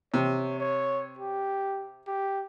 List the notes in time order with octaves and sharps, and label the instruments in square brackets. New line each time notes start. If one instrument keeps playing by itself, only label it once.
[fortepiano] C3 [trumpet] C#5
[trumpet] C#5
G4
G4